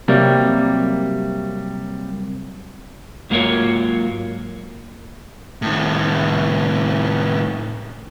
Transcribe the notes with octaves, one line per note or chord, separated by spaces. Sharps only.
C3 F#3 G3 A#3
G#2 F#3 A#3 F4 A#4 C#5
A2 D#3